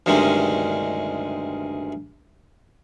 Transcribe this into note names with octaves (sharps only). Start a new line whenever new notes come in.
D2 G2 C3 D#3 G#3 C#4